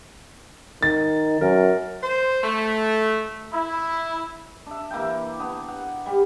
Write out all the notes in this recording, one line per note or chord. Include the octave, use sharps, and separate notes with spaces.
D#3 A6
F#2 A#4
C5
A3
E4
D4 E5
E3 A#3 E4 G5
B3 D4
F#5
G3